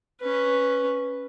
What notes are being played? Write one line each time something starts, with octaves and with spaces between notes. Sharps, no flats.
C#4 B4